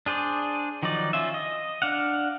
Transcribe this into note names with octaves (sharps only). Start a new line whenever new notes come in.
D4 G#4 C5 D5
D#3 F3 F#3 D#4 D5
C#4 F4 E5
D#5
D4 F5 F#5